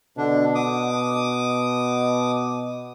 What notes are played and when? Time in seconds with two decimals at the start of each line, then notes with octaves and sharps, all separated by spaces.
0.17 B2 D3 D4
0.55 D6 D#6